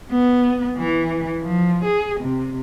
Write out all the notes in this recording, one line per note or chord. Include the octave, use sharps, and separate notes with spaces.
B3
E3
F3
G#4
C3